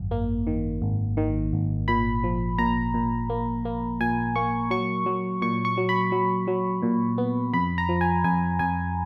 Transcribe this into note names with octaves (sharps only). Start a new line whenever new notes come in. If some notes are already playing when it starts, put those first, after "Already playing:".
Already playing: G#1 F#2
A#3
D#3
G#1
D#3
G#1
A#2 B5
F3
A#2 A#5
A#2
A#3
A#3
A#2 G#5
A#3 C#6
F#3 C#6
F#3
A#2 C#6
C#6
F#3
B5
F#3
F#3
A#2
B3
F2 B5
A#5
F3
G#5
F2 G#5
F2 G#5